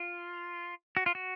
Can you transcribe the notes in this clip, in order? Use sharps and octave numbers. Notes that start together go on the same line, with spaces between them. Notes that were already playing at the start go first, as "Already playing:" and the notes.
Already playing: F4
F#4
F4
F#4